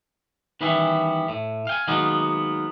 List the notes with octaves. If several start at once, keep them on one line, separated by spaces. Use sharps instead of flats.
D#3 E3 G3 B3 C#4 E4
A2
F5 G5 G#5
D#3 F#3 G#3 A#3 B3 D#4